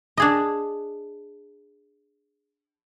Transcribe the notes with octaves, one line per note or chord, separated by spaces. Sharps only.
D4 G#4 D#5